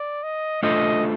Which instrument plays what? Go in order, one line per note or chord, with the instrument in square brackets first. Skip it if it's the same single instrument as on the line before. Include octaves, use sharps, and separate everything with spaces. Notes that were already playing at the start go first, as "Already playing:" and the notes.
Already playing: [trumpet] D5
D#5
[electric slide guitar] A3 D4 F4 A4 C5 [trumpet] D#5